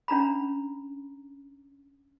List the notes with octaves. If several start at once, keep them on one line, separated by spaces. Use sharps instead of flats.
C#4 D4 A#5 B5